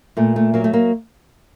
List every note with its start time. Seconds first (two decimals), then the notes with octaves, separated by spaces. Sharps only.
0.17 A#2 A3
0.36 A3
0.54 F#3 A#3
0.64 A3
0.73 A#3